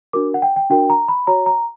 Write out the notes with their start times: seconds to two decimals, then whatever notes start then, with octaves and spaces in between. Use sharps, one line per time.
0.13 D4 F#4 A#4 D6
0.34 F#5
0.42 G5
0.56 G5
0.70 D4 F#4 A#4 G5
0.90 A#5
1.08 B5
1.27 F#4 C#5 A#5
1.46 A#5